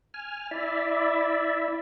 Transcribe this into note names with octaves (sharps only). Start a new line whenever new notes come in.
G#5 F6
E4 D5 E5